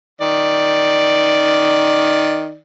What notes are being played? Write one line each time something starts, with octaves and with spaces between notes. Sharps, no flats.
D#3 D5